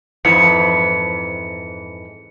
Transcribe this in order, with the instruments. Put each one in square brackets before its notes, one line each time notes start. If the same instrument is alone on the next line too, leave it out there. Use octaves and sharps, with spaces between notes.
[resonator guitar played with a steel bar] F2 G#2 E3 [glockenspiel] C#7